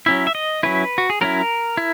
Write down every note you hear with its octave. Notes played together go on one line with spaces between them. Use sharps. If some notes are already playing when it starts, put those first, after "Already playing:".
F#3 C#4 E4 E5
E5
D#5
F#3 C#4 E4 B4
F#4
G#4
F#3 C#4 E4 A#4
E4